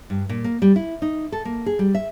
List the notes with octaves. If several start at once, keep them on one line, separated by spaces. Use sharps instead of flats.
G2
A#2
A#3
G3
E4
D#4
A4
A#3
G#4
G3
E5